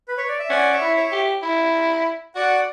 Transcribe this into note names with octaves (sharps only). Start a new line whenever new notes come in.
B4
C#5
D5
E5
C#4 D5 F#5
C#5 E5
E4
C#5 E5
G4
E4
F#4 D5 F#5